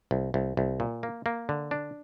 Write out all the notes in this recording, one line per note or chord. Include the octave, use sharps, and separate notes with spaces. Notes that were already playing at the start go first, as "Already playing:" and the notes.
C2
C2
C2
A#2
A#3
A#3
D3
D4